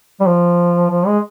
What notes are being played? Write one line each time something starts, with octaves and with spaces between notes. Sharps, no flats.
G3
F3
F3
G#3